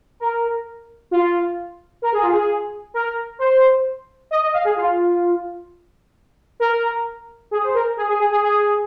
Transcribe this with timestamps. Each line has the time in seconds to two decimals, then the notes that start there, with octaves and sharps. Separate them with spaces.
0.20 A#4
1.11 F4
2.02 A#4
2.13 G#4
2.22 F4
2.32 G#4
2.94 A#4
3.39 C5
4.31 D#5
4.42 D#5
4.53 F5
4.65 G#4
4.76 F4
6.60 A#4
7.51 G#4
7.63 C5
7.74 A#4
7.97 G#4
8.08 G#4
8.20 G#4
8.31 G#4
8.43 G#4